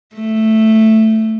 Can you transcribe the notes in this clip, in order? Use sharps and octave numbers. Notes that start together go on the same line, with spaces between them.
A3